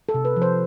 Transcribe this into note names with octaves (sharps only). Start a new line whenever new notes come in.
A4
C3
B4
F3
C5